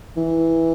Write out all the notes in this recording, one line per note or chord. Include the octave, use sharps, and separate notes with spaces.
E3